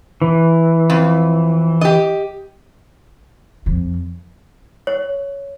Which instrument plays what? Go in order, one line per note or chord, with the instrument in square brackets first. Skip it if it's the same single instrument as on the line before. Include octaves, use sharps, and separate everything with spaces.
[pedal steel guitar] E3
[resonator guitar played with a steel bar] F2
G4 D#5
[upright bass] F2
[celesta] C#5